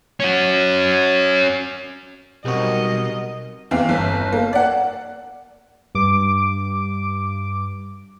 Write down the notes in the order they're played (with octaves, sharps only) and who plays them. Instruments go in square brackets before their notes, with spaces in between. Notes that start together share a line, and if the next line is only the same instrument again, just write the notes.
[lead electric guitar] C#4 F#4
[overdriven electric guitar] B1 [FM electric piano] G3 C4 F#4 [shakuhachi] A#4 [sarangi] D#5
[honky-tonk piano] E2 E3 C4 F5
G1
A#3
D5 F#5
[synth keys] G2 D6